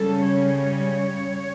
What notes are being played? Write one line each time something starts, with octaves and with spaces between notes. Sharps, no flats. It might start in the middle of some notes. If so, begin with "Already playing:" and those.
Already playing: C#3 G3 C#4 A4
C#5